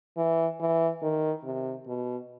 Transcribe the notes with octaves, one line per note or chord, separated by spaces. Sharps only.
E3
E3
D#3
C3
B2